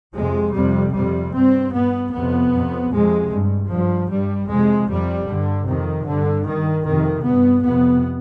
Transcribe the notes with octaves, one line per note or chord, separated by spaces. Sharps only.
F2 C3 G#3
F2 C3 G3
F2 C3 G3
G2 C4
G2 B3
F2 C3 B3
F2 C3
F2 C3 G#3
G2
G2 F3
G2 G3
F2 C3 G#3
F2 C3 G3
G2 D3
F2 C3 D#3
G2 D3
G2 D#3
F2 C3 D#3
G2 B3
F2 C3 B3